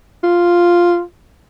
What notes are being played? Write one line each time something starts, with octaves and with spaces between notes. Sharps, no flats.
F4